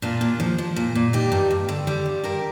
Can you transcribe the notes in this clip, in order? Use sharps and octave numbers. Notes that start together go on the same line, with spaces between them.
A#2 D4 F4
A#2
F3
F3
A#2
A#2
G3 D#4 G4
G2
G2
D3
G3
G2
G2 G4 A#4